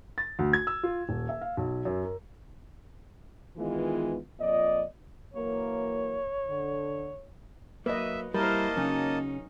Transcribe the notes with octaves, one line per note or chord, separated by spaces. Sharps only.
A6
D2
G#6
E6
F4
D#1
E5
F5
B1
F#2
A#4
D#3 E3 G#3 B3 F4
F2 A#2 D5 D#5
E3 F#3 A#3 C#5
D3
F#3 A#3 B4 D#5 E5
G3 A#3 E4 A#4 C5 D#5 A5
C#3 F#3 C#4 D#4